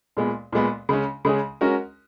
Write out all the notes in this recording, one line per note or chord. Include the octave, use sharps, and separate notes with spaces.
A#2 G#3 B3
A#2 G#3 B3
C#3 G#3 C#4
C#3 G#3 C#4 G#4
G#3 C#4 F#4 A#4